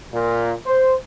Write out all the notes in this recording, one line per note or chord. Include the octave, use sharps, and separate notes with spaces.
A#2
C5